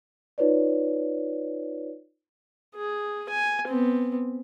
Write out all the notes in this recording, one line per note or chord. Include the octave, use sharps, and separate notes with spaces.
D#4 F4 B4 C#5 D5
G#4
G#5
B3 C4